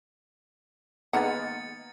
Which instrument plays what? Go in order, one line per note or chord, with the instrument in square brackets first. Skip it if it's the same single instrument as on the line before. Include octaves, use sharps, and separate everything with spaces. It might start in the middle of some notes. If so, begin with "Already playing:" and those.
[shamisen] D#3 G#3 F#5 [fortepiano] A#3 B3 D#4 [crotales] A6 C#7